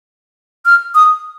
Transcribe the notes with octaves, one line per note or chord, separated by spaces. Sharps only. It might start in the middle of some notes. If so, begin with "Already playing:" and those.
F6
D#6